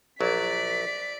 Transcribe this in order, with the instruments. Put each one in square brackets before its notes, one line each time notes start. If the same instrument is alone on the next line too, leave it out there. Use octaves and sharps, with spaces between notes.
[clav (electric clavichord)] A#1 F#3 [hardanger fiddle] D5 [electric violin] B6